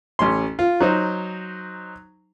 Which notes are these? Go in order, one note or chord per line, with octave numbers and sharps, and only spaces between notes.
A1 C#4 C6
F4
F#3 D#4 C5